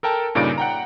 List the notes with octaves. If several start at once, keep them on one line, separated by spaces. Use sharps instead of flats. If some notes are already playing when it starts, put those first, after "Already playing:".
A4 A#4 G5 A5
G2 A#2 C#3 D#4 D5 D7
F#5 G5 A#5